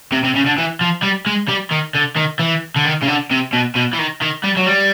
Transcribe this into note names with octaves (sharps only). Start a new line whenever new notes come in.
C3
C3
C#3
D3
E3
F3
G3
G#3
G3
D#3
D3
D#3
E3
D3
D#3
C#3
D3
C3
B2
B2
E3
D#3
D#3
G3
F#3
G3